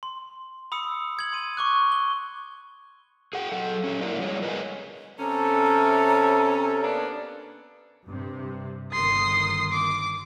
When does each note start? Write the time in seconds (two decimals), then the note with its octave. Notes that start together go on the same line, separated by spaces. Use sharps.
0.03 C6
0.72 B5 D#6 E6 C#7
1.17 D#6 G#6 F#7
1.33 C6 D#7
1.57 C#6 D6 F#6
1.92 G7
3.33 G#4 F#5 G5
3.52 F#3 A4
3.84 C#4 E4 G4
4.01 A#3 E4 A4 A#4 C#5 D5
4.18 F3 G3 G#3 C#5
4.42 G#4 A#4 B4 C#5 D#5 G#5
5.19 C3 C#4 A4 A#5
6.82 A#3 B3 D4
8.06 G2 C3
8.92 G1 D#3 C6 D#6
9.71 D6